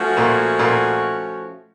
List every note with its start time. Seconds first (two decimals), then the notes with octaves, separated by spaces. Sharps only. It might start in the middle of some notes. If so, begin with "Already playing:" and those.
Already playing: F3 A3 C#4 F#4
0.17 A#2 A#3
0.59 A#2 A#3